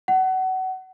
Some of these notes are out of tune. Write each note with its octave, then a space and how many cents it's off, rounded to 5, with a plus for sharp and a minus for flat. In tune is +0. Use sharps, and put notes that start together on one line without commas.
F#5 +25